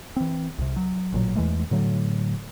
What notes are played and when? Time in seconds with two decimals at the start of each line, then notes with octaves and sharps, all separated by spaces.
0.16 E3 C4
0.58 C2 C3
0.76 F#3
1.13 A1 A#2 D3 F#3
1.35 E2 E3 G#3 A3
1.71 A2 D3 F#3 A3